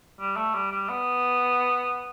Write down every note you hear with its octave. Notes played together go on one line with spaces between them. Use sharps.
G3
A3
G3
G3
B3